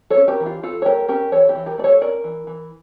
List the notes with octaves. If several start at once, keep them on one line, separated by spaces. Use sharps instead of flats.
A4 C#5
C#4
G4 A#4
E3
F4
E3 F4 A4
C#5
A3 G4 A#4
C#4 G4 A#4
E3 A4 C#5
E4 G4
E3
G4 A#4
A3 D5
A4 C#5
C#4 A#4 D5
E3
E3